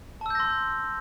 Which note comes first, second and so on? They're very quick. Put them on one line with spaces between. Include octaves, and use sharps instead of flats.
A5 E6 G6 A#6 C6